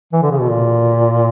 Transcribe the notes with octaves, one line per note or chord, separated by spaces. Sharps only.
E3
D3
C#3
B2
A#2